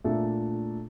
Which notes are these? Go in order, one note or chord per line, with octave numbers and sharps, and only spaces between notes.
A#2 A3 D4 A4